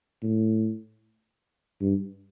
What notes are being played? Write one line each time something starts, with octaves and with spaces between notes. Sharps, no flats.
A2
G2